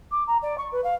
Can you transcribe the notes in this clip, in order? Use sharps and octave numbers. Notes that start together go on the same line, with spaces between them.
D6
A#5
D5
C#6
B4
F5